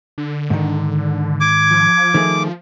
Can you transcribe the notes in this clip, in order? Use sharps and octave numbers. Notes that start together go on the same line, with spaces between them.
D3
G#2 D#3
D6 G#6
F3
D#3 A3 G#4